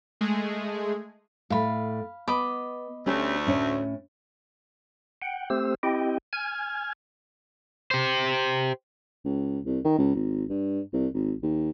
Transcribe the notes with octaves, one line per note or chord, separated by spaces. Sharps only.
G#3 A3 G#4
A2 A3 F5 B5
B3 D#5 B5 D6
D2 A3 C#4 G4
A2 C#4 C#5
F#5 G5
A3 C4 G4 C5 E6
C4 E4 G4 D#5 G5
G#5 F6 G#6
G4 C5
C#2
C2
D#3
C#2
G#1
G2
C2
G#1
D#2